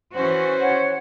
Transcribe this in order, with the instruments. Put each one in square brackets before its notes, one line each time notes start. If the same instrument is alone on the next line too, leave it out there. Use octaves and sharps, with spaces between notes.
[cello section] E3 C#4 F#4 [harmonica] C5
[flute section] C#5 F#5